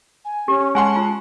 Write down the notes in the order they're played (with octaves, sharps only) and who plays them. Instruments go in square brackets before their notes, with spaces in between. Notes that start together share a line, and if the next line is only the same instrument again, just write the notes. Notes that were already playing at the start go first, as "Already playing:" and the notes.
[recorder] G#5
[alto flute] C#4 [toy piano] G4
[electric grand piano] G#3 F#5 C6 [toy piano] G#5 [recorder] A5
[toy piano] F4